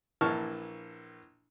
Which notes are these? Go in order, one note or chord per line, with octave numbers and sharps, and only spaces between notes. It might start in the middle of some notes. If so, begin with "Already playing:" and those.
A#1 E3 A#3 A5 C#6 F6